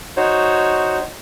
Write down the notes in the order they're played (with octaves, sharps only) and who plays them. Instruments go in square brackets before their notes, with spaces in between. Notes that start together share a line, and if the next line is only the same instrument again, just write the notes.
[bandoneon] D#4 F#4 C5 C#5